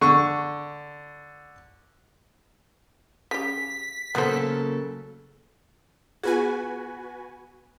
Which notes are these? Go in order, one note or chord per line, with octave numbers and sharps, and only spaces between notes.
D3 C#6
C#3 G4 B6
C#3 F#3 A#3 B3 A4 C5
B3 F4 F#4 G#4 B4 G#5